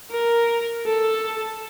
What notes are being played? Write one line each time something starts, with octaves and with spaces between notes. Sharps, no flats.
A#4
A4